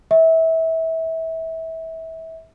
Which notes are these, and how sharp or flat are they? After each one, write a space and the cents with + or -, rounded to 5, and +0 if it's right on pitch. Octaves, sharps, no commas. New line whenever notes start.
E5 -25